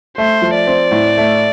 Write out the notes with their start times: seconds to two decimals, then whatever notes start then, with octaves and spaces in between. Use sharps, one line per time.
0.17 A3 C5
0.42 F3
0.54 D5
0.67 C4
0.91 A2
1.17 A3